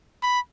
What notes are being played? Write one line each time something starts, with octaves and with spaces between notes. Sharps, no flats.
B5